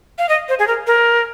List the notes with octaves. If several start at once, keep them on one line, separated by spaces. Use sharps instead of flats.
F5
D#5
C5
G#4
A#4
A#4